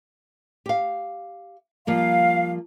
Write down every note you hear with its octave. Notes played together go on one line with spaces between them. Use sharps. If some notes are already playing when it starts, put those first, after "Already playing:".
G4 F5
F3 G3 A#3 F5